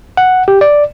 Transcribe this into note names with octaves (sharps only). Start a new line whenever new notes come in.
F#5
G4
D5